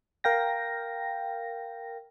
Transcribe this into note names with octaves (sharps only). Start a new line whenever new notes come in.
A#4 F5 G5 A#6